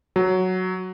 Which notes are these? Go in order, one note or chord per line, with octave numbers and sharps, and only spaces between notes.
F#3